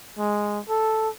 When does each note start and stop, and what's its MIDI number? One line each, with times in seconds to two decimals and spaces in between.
0.18 0.59 56
0.69 1.09 69